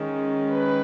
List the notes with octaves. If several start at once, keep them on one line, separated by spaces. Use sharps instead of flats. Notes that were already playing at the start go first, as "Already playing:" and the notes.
Already playing: D#3 G#3 C#4
B4